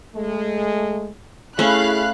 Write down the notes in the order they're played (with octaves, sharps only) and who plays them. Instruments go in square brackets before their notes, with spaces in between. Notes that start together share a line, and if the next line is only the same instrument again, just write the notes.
[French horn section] G#3 A3
[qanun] A3 C#4 [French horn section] E4 G#4 [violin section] F5 B5 F#6